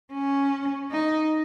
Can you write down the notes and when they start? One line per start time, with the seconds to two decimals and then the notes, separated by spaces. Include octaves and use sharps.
0.13 C#4
0.91 D#4